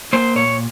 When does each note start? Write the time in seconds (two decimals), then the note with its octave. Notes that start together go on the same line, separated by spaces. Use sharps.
0.13 A#3 C5
0.35 A#2 C#5